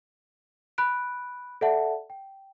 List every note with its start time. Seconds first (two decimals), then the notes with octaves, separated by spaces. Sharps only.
0.78 B5 F#6 D7
1.61 A4 D5 E5 F#5 A5
2.10 G5